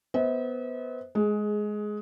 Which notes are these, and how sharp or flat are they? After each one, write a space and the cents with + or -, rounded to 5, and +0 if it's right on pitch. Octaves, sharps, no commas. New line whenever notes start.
B3 +0 C5 +0 E5 -45
G#3 +15 G#4 +0